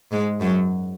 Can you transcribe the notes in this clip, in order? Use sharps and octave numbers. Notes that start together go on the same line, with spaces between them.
G#2 G#3
F#2 F#3